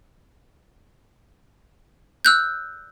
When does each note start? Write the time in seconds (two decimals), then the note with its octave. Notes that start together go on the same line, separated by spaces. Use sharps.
2.25 E6 F#6 G6